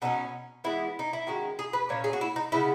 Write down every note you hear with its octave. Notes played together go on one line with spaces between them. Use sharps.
B2 F#3 A#3 C#4 D#4
E3 G#3 B3 E4
D#4
E4
D#3 G#3 C#4 F#4
G#4
B4
A#2 A#3 C#4 C#5
G#4
F#4
E4
D#4
C#3 G#3 B3 E4